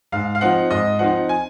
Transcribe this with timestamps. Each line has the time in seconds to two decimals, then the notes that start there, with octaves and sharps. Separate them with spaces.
0.12 G#2 F5
0.35 F5
0.41 F3 C4 D#4 F#5
0.71 G#2 D#5
0.99 F3 C4 D#4 F#5
1.29 G#5